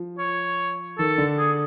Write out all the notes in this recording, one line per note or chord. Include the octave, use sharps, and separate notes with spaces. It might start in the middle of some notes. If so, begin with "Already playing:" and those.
Already playing: F3
C#5
D#3 A4
D3
G#4